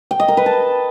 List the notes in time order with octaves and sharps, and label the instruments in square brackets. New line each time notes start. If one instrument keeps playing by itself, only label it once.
[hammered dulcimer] G5
D#5
A#4
B4
A5